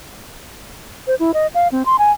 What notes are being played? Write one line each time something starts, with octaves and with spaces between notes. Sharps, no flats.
C5
E4
D#5
F5
C4
C6
G#5